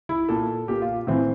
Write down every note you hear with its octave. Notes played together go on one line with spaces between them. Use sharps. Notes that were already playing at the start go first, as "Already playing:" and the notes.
E4
A#2 A4
A#2 G4
F4
A2 E3 C4